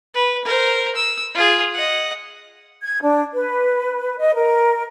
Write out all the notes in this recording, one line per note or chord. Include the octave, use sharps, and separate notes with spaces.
B4
A#4 C5
E6
F4 G#4
D#5 F#5
G#6
D4
B4
D#5
A#4